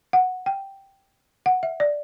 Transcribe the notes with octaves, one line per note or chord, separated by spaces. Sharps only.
F#5
G5
F#5
E5
D5